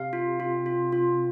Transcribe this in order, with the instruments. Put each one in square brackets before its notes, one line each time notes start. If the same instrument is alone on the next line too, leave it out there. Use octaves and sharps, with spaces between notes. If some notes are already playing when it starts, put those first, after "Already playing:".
Already playing: [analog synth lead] C3 [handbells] F5
[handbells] F4
F4
F4
F4